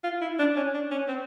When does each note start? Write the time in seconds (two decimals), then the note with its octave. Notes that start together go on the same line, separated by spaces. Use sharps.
0.04 F4
0.21 E4
0.39 D4
0.56 C#4
0.74 D4
0.92 C#4
1.08 C4